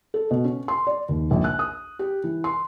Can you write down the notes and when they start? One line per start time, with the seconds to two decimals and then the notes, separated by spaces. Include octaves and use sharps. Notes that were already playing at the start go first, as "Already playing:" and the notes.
0.14 A4
0.31 B2
0.44 C#4
0.68 C6
0.87 D5
1.09 D#2
1.31 A#1
1.44 F#6
1.59 D#6
1.99 G4
2.24 E3
2.44 C6